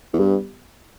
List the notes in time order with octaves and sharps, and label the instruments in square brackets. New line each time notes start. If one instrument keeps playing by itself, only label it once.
[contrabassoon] E2
[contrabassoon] G2 [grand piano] G3 B3 G4